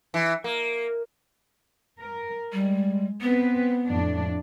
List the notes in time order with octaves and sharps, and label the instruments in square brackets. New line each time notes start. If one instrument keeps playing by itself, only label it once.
[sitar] E3
A#3
[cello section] A#4
[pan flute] G3 [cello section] G#3
[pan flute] B3 [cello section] C4 B4
[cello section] F2 A2 D4